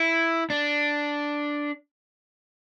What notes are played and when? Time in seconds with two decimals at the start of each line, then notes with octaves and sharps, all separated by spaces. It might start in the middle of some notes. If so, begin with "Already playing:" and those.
Already playing: E4
0.50 D4